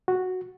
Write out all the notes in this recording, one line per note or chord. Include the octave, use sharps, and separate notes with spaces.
F#4